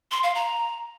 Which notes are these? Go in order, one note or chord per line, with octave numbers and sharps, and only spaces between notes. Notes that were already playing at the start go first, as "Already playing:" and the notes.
C6
F5
A#5